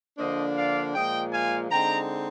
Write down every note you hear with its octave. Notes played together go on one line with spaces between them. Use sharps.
D3 F3 A#3 D4 C5 D#5
D5 F5
A#2 F3 G#3 D#5 G5
F5 G#5
D3 G#3 C4 D#4 G5 A#5